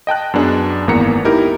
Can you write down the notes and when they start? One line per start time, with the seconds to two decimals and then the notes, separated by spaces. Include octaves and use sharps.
0.07 D#5 G5 A5 F#6
0.34 F#2 B3 D4 G#4
0.87 G#1 E2 A#3 B3 A#5 C#7
1.25 D#4 E4 G4 A#4